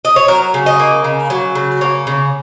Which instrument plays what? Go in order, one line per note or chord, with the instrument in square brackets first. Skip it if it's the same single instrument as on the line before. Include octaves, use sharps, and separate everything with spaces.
[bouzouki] D#5
C#5
F#3 A#4
C#3
D#5
A#3
C#3
F#3
C#3
A#3 C#5
C#3